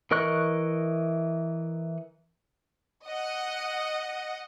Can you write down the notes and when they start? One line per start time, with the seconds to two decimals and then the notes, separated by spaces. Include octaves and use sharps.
0.11 E3 A#4 D#5 C#6 F#6
3.08 D#5 F#5